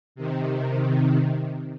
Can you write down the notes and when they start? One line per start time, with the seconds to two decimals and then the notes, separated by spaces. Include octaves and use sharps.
0.15 C3 D#3